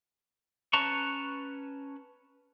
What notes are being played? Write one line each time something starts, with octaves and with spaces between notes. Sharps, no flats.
C#4 B4 A5 A#5 C#6